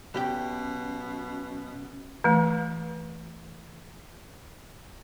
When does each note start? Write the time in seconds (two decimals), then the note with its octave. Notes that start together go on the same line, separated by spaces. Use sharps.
0.14 B1 B2 C#4 G4 G5
2.24 E3 A3